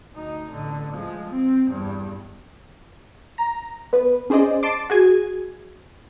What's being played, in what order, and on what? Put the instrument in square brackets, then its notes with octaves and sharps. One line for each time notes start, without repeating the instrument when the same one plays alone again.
[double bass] D2 D#4
A1 D3
F3 G#3
C4
E2 G2
[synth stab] A#5
B3 B4
C#4 G#4 C5 D5 D#5
A5 C6 D6
F#4 G#4 G#5